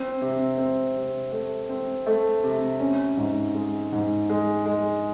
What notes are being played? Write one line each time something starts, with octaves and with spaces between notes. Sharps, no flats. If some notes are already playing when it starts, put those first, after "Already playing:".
Already playing: C4
C3
C4
C3
A3
C4
A3
C3
C#4
G#2
G#3
G#2
G#3
G#3